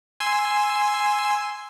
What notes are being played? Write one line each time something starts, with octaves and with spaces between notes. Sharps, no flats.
G#5 C6 E6